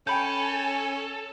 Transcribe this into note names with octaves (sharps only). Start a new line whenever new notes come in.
C#4 A4 G5 G#5 B5 G6